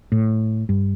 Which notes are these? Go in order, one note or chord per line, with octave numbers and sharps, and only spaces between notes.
A2
G2